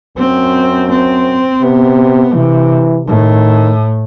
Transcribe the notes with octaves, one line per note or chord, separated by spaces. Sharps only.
F#2 C4
C4
C3 B3
C3 E3
A2 D#3